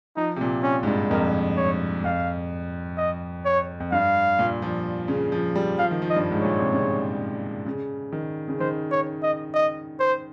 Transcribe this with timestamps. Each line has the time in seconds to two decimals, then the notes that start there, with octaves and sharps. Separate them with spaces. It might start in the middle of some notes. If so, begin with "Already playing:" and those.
0.17 F3 D#4
0.36 C3
0.41 A#2
0.63 C#4
0.83 G#2
0.87 G2
1.10 F2 A#4
1.57 C#5
2.04 F2 F5
2.97 D#5
3.45 C#5
3.80 F2
3.92 G2 F5
4.39 A#2
4.62 F3
5.08 C#3
5.32 F3
5.56 G3
5.79 F3 F5
5.91 D#3
6.02 F3
6.10 D#5
6.16 G2
6.31 G#2
6.41 A#2 C#5
6.58 C3
6.73 C#3
7.66 C#3
8.13 D#3
8.48 C#3
8.60 D#3 C5
8.91 C#5
9.23 D#5
9.54 D#5
10.00 C5